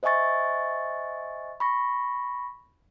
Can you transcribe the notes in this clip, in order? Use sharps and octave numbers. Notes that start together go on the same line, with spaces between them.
C5 D#5 E5 G#5 C#6 A6
B5 C#6 A#6